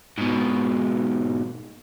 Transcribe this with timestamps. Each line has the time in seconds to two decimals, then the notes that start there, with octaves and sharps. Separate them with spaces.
0.18 G#2 B2